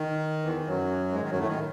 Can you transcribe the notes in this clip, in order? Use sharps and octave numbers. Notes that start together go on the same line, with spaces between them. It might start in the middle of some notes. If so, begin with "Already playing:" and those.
Already playing: D#3
E2 E3
D#3
F#2 F#3
G#2 G#3
D#3
F#2 F#3
A2 A3
D#3